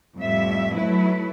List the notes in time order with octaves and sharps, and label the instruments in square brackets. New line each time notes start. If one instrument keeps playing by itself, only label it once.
[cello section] F2 A2 G3 E5
F#3 A3 E4 B4